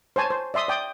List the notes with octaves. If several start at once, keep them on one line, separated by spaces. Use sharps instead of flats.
C5 C#5 G#5 A5
C5
D5 E5 C6 D#6
D5 G5 D#6